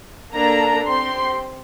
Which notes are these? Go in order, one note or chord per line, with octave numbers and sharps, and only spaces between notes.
A#3 D4 A4 A#5
C4 G4 C6